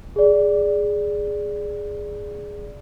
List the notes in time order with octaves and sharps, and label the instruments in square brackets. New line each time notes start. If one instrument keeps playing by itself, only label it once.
[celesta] G#4 D5